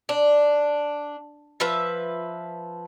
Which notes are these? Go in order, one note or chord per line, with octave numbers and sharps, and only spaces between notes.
D4
F3 B4 E5